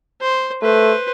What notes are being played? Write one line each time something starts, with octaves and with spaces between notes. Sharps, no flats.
C5
A3 B4 C5